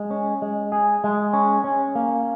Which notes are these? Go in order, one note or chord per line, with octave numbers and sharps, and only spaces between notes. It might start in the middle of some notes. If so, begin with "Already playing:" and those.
Already playing: G#3
C#4
G#3
G#4
G#3
C#4
C#4
A#3